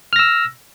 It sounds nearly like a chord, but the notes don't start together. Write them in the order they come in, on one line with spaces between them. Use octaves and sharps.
F6 A#6 E6